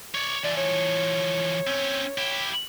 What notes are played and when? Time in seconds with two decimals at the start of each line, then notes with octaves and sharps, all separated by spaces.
0.15 C#5 D5
0.44 E3 F3 D5
0.57 C#5
1.67 C4 C#4
2.18 E4 G4